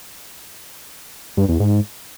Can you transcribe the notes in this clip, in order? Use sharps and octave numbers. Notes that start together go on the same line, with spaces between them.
G2
E2
G#2